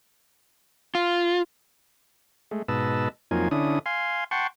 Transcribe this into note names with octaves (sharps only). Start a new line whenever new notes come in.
F4
G#3 A3
G#2 B2 B4 D#5 A5 E6
F2 F#3 A#3 D#4 F4 G#5
D3 C#4 D4 E4 D#6
F5 G#5 C6
F#5 G5 A5 C6 C#6